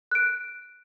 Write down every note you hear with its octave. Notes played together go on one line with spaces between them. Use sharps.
F#6 D7